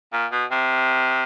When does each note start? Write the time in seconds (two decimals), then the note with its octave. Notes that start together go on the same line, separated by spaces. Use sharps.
0.13 A#2
0.32 B2
0.51 C3